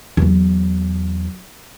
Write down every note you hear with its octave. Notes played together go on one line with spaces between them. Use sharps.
E2 F#3